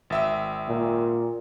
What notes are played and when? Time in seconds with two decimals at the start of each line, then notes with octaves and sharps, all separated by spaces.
0.10 G#1 E5 E6
0.69 A#2